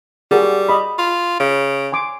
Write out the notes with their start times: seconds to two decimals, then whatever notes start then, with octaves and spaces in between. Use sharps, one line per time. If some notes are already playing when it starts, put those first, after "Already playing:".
0.31 G3 F#4 G#4 A#4
0.69 D#5 B5
0.99 F4
1.40 C#3
1.92 G#5 C6 D6